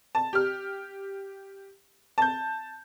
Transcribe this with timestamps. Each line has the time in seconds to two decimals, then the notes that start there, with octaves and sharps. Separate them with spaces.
0.15 A5
0.33 G4 F6
2.18 A5 G6